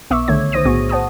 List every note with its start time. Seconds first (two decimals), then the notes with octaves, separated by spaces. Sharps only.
0.10 B1 B3 E5 C#6 D6 E6
0.28 C2 D3 D#3 A3 C#5 G#6
0.52 D#3 C5 D#6 A#6 D#7
0.65 B1 A2 B3 F#4 G#4 C#6
0.89 C5 F#5 A5 D#6